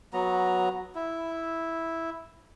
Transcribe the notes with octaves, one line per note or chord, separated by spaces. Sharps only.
F#3 B3 A#5
E4